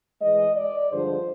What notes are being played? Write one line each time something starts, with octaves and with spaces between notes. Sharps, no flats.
G#2 E3 G#3 D#5
D5
G2 D3 F3 G#3 C5